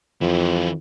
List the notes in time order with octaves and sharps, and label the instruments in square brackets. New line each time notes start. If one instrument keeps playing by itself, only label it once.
[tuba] F2 [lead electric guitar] E3 F4